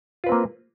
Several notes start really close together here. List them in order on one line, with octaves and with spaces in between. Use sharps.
F4 B4 C4 A#3